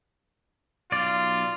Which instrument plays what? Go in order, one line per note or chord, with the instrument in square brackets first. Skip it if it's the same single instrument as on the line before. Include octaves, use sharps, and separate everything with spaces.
[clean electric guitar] B1 D5 [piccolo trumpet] F4